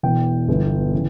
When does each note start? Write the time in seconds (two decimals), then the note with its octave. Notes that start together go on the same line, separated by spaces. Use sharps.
0.03 E1 E2 E3 G5
0.48 G1 G2 E3
0.93 C#3 E3